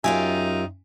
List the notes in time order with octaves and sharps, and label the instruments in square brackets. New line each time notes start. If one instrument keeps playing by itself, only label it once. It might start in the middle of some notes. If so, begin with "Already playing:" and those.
[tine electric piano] F#2 E5 [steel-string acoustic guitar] C#4 F4 G4 [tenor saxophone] D#4 [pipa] G#5